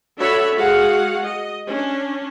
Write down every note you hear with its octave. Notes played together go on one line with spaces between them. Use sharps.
D4 F#4 A4 C#5 E5 B5
G#3 F#4 G#4 F5 F#5
D#5
C#4 D4